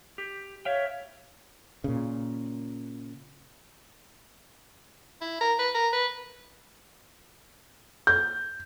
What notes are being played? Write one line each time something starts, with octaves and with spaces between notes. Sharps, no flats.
G4
C#5 E5 F5 G5
A#2 C#3
E4
A#4
B4
A#4
B4
G6